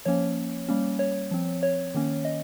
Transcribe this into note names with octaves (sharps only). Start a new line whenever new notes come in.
F3 A#3 C#4 C#5
G3 A#3 C#4
C#5
F3 C4
C#5
D#3 A#3 C#4
D#5